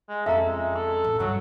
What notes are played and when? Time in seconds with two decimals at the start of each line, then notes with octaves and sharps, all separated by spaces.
0.09 G#3
0.26 F2 C#4 A4 E5 F5 A#5
0.47 G#3
0.76 A4 C6
1.04 A1
1.19 G2 D3 F#3